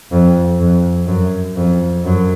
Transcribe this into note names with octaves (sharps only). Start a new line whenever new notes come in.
F2
F2
F#2
F2
F#2